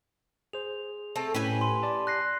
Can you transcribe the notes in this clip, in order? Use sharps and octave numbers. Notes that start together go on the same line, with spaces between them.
G#4 C5 F7
A3 C4 A4
A2 C#4 G4 B4 G#5 B5
C6
D5 A5
F#6 A#6 C7